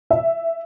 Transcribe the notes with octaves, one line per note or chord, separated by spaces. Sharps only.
E5